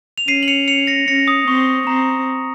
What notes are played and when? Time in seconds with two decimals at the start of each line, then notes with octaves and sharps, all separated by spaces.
0.18 F7
0.28 C#4 C7 D#7
0.43 F#7
0.48 C#7 F7
0.68 C#7 F7
0.87 A#6 C#7
1.08 C#4 A#6 C#7
1.28 D#6
1.47 C4 C#6
1.87 C4 A#5